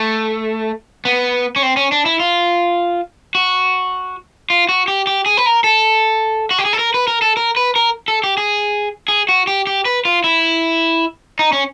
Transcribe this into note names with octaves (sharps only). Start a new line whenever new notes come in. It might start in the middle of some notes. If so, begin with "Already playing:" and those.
Already playing: A3
B3
C#4
C4
C#4
D4
E4
F4
F#4
F4
F#4
G4
G4
G#4
B4
A#4
A4
F#4
G4
G#4
A4
A#4
B4
A#4
A4
A#4
B4
A#4
A4
G4
G#4
G#4
F#4
G4
G4
B4
F4
E4
D#4
C#4